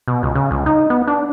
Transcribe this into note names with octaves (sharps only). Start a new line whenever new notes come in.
B2
C#2
C#3
C#2
D#4
B3
D4